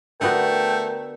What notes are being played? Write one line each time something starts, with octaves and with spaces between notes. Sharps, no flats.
D3 A3 B3 F#4 A#4 G5